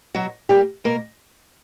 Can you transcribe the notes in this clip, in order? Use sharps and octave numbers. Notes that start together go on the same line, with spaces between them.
B2 F#3 F#4
G3 A#3 G4
B2 A#3 A#4